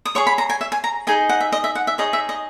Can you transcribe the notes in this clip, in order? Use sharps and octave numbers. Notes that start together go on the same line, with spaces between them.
D#6
G#4 C#5 C#6
B5
A#5
G#5
E5
G#5
A#5
D#4 G#4 D#5 G#5
F#5
E5
D#5
E5
F#5
E5
D#4 G#4 C#5 D#5
E5
D#5